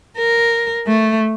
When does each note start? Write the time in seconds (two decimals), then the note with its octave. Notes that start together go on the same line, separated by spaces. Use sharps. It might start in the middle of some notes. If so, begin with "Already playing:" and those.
0.18 A#4
0.87 A3